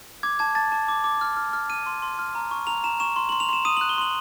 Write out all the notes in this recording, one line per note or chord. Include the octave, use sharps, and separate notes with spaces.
D6 G#6
A5 G#6
A5 A6
A5
D6
D6
F6
F6
F6
F6 D#7
C6
C6
F6
A#5
C#6
A#5 F7
A#5 E7
C#6 E7
C6
C6 F#7
F7
C6 E7
D#6 D#7
F#6 F#7
G7
C6 F#7